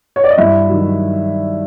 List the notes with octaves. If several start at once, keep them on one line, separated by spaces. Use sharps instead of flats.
C#5
D5
D#5
G2 E4 E5
D#3 F#3